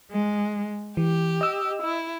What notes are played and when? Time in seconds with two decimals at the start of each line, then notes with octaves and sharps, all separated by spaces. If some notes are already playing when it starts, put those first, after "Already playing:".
0.11 G#3
0.97 E3 G4
1.41 D#5 E6
1.83 E4